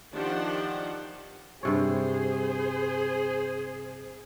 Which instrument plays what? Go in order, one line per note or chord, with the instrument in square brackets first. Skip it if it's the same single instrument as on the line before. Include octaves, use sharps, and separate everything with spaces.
[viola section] D#3 F3 D4 G4 C5 F#5
[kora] G2 C3 C#5 [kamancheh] G#4 C5